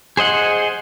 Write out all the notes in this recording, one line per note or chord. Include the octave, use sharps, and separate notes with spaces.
G#4 C5 D#5 F#5